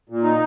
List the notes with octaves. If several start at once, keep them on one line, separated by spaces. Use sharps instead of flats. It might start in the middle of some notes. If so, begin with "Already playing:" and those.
A#2
D#4